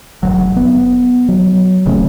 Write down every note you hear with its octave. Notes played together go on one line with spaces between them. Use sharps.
F1 C#2 F#3
B3
F#3
D#1 C#3 A3 C#4